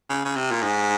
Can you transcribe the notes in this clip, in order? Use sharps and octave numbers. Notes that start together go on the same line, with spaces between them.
C#3
C#3
C3
A#2
G#2